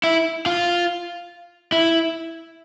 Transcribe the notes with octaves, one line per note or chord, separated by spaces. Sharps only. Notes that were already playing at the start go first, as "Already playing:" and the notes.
E4
F4
E4